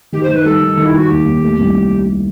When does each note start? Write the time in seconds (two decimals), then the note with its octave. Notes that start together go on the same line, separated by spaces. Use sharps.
0.12 D#3 G4
0.23 C5
0.29 D#3
0.35 B4
0.45 G3 A4
0.61 D#3
0.77 D#3
0.86 E4
0.94 D#3 F#4
1.10 D#2 G4
1.26 D#2
1.42 A3
1.59 C2